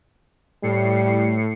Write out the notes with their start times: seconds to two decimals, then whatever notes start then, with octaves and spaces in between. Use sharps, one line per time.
0.63 A2 G3 C7 C#7